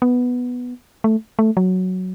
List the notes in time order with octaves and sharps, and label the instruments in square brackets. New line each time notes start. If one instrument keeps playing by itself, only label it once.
[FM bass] B3
A3
A3
F#3